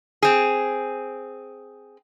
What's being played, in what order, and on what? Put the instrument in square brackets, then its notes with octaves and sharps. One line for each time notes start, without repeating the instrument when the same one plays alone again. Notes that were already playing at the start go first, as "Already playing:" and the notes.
[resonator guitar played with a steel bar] C4 G#4